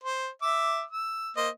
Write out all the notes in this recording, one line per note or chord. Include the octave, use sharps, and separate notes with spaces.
C5
E5 D6 E6
E6
A#3 C5 D#5